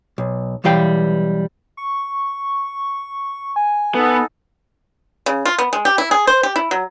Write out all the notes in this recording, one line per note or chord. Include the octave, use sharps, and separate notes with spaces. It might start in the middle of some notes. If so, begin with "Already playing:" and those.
B1
B1 E3 G3 F5 G5
C#6
G#5
B3 D#4 A4 F#5
C#3
F4
B3
G#3
G4
E4
G#4
C5
G4
E4
F#3